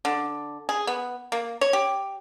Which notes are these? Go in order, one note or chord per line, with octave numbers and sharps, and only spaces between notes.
D3
G#4
B3
A#3
C#5
G4